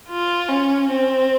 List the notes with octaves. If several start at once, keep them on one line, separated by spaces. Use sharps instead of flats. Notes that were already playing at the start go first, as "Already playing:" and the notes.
F4
C#4
C4